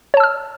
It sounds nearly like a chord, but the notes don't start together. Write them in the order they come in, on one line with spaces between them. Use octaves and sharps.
C#5 A5 E6 F6